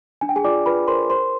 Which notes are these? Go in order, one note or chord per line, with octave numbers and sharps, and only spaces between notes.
D4 G#5
G5
G#4 G#5
F4 D5 D6
F4 B4 B5
A#4 C5 C6
C5 C6